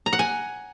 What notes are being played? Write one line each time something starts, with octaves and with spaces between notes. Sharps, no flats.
A#5
F#5
G#5